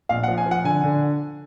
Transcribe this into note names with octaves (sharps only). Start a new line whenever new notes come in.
A#1 F5
F#5
F3
G#5
F3
F#5
D3 G#5
D3